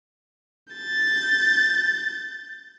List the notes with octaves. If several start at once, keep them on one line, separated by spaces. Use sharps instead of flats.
G6 A6